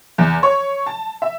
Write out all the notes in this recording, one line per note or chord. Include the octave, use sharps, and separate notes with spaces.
E2
C#5
A5
E5